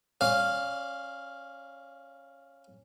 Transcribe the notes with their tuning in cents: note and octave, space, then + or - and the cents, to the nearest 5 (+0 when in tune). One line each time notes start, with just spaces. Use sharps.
C#4 -15 D5 -35 F5 +0